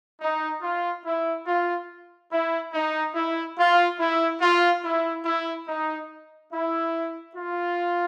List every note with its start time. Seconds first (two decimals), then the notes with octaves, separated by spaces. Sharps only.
0.21 D#4
0.62 F4
1.05 E4
1.47 F4
2.32 E4
2.73 D#4
3.15 E4
3.58 F4
3.99 E4
4.41 F4
4.84 E4
5.25 E4
5.68 D#4
6.52 E4
7.35 F4